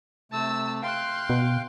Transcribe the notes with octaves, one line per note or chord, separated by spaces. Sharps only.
C3 A3 A5 E6
F5 G5 C6 F#6
B2